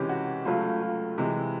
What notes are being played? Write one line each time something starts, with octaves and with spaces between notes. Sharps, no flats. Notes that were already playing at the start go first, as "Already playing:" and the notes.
Already playing: C#2 C3 E3 G#3 C#4 G4
F#4
C#2 C#3 F#3 A3 F4
F4
C3 E3 G#3 E4